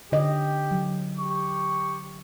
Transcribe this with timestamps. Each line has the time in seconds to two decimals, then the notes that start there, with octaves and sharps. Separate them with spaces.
0.12 D3 G4 D#5
0.71 F#3
1.18 G4 C#6